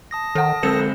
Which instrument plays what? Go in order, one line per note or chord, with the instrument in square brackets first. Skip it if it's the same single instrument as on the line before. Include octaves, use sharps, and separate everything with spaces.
[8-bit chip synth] A5 D#6 A#6
[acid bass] D#3 [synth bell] A4 F#5
[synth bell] D3 C#7 E7 [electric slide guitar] G#3 C4 [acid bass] A4